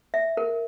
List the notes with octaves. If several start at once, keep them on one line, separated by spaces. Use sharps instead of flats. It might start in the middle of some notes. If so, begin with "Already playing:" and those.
E5
A#4